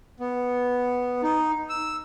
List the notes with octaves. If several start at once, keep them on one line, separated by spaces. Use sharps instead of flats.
B3
D#4
E6